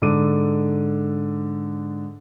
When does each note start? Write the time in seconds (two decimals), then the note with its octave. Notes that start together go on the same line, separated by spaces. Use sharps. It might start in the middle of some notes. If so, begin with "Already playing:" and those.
0.02 G#2 D3 A4 D6 D#7